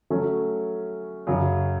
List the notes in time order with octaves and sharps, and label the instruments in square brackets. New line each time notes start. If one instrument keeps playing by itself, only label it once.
[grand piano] F#3 A3 C#4
F#2 C#3 F#3